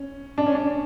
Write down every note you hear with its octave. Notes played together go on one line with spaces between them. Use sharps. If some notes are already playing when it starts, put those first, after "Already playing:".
Already playing: C#4
D4
C#4
D4